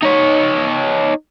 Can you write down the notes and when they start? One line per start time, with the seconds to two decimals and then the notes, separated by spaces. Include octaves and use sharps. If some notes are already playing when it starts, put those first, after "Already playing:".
0.03 D#4 C#5